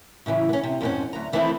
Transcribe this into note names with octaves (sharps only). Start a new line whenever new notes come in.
A2 C#3 E3 F#3
B3 C#4
C3
F2 G#2 B2 A#3 C4 C#4
D2 F#3 A#5
D#3 E3 A3 B3 C4 E4